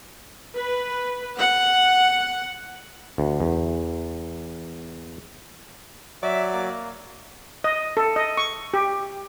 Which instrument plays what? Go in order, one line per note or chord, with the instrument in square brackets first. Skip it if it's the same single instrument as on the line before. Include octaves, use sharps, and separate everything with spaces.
[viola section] B4
F#5
[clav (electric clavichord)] D2
E2
[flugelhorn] F#3 [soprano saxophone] D5 [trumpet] E5
[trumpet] A#3
[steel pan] D#5
A4
D#5
C#6
G4